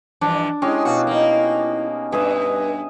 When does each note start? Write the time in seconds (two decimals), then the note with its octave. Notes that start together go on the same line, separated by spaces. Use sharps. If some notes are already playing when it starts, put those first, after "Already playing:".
0.21 G2 E3 F3 D4
0.62 G#3 C#4 E4 G4 G#4
0.85 B2 F#4 F5
1.07 A#3 D#4
2.12 G2 G#4 B4 E5